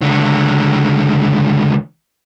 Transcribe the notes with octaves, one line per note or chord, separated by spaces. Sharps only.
C#2 D3